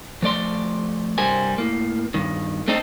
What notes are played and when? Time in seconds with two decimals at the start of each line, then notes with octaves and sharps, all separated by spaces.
0.22 F3 A3 D5 C6
1.18 C2 G2 G3 A#4 C5 G#5
1.58 A2 A#3
2.14 G2 D#3
2.68 A3 C4 D4 D#4 A4